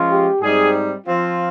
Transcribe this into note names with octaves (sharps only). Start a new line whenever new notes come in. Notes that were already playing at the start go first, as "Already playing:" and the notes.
Already playing: F3 G#3 C#4 F4
G4
G#2 G3 C4 D#4 G#4
F3 C4 F4